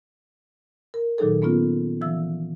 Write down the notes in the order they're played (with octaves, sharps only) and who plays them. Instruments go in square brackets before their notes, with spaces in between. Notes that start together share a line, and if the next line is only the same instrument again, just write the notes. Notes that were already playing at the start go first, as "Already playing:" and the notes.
[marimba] A#4
A#2 D#3 F#3 D#4 G#4 A4
A#3 B3 C#4 F4
D3 E3 F3 E5 E6